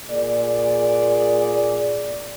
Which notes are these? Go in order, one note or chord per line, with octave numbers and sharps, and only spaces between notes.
A#2 G#4 D5